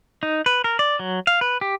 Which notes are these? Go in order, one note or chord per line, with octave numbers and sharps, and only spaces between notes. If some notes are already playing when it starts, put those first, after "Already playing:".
D#4
B4
A#4
D5
F#3
F5
B4
G4